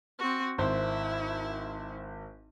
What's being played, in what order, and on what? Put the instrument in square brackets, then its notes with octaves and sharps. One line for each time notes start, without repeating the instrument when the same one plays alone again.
[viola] C4 F#4
[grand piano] G#1 C5 [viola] E4